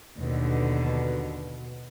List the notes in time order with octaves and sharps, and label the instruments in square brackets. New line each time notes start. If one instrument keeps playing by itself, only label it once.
[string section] D#2 D3 [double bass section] B2